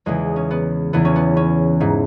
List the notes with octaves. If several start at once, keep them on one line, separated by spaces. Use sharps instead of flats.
E2 C#3 E3 G#3
C#4
B3
E2 C#3 E3 B3
C#4
B3
C#4
G#2 E3